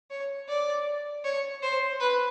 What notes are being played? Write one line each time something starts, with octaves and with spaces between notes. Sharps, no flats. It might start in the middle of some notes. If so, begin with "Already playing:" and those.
C#5
D5
C#5
C5
B4